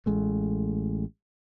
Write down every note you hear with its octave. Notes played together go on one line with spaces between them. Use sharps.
A1 G#3 A3